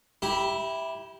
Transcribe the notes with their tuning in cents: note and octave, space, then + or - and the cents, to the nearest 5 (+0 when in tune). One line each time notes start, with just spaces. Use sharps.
E4 +0 G4 +0 B5 -45